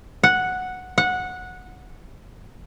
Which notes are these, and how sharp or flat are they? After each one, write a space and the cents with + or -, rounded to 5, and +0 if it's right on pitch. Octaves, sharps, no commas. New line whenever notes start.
F#5 -5
F#5 -15